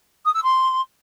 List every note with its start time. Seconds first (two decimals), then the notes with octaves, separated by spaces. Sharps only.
0.25 D#6
0.34 E6
0.43 C6